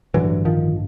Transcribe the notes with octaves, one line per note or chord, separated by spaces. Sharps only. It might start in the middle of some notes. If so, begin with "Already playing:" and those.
A1 G2 D3 E3 F#3
D#3 F3